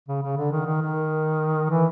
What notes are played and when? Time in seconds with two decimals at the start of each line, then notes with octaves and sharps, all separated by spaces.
0.08 C#3
0.23 C#3
0.37 D3
0.52 D#3
0.66 D#3
0.82 D#3
1.70 E3